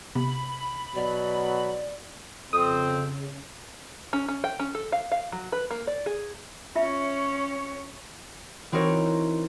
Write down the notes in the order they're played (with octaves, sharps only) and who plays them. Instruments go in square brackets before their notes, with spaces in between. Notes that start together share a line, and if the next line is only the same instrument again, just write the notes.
[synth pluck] C3 B3 [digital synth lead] B5
[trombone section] B2 F#3 [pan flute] D5
[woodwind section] F2 C4 [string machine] C#3 [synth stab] D#6
[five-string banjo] C#4
C#4
G5
C#4
A4
F5
F5
F#3
B4
A#3
D5
G#4
[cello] C#4 C#5 [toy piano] F4 E5
[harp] E3 C4 D#4 F#4 A#4 C#5